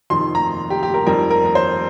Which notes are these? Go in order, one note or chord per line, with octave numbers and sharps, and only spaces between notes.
F2 C3 D#3 C6
A#5
G4
G4
A#4
F2 D#3 G3 A#4
A#4
A#4
C5